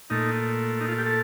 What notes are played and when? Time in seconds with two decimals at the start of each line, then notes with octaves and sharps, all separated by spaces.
0.10 A#2 A3 D#4
0.81 D#4
0.88 F4
0.98 G4
1.06 A4